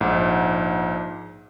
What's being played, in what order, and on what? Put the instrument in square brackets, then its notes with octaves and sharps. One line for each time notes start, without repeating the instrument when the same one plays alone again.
[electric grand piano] A#1 G#2